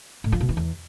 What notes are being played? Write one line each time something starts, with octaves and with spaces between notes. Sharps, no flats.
A2
F3
B2
E3
E2